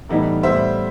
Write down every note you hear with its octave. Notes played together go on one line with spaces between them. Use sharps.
A2 E3 G3 B3 D#4
A2 G3 B3 C5 E5